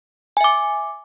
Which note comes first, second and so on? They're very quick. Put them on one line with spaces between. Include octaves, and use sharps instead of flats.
G#5 E5 D6